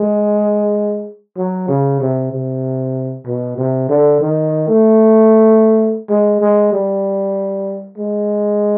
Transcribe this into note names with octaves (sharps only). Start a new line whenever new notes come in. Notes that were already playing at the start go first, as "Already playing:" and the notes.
Already playing: G#3
F#3
C#3
C3
C3
B2
C3
D3
D#3
A3
G#3
G#3
G3
G#3